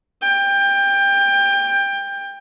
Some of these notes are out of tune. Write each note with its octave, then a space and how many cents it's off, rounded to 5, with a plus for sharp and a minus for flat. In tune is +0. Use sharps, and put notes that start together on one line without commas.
G5 +20